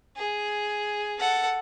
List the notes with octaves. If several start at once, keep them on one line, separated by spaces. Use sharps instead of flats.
G#4
A4 F#5